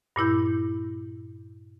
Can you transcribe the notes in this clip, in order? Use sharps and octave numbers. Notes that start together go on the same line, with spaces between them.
G2 A#2 E4 G6